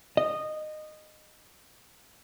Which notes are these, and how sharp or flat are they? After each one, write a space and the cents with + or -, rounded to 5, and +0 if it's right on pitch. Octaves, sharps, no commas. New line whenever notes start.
D#5 -15